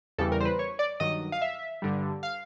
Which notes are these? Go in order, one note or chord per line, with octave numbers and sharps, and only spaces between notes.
E2 C#3 E3 G3 A4
A#4
C5
B4
C#5
D5
G2 D#3 F#3 D#5
F5
E5
G2 D3 G3
F5